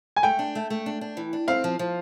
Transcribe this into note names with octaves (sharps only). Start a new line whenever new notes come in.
G#5
A3 G5
D4
A3
A3
D4
D4
E3
D4
C4 F5
F3
F3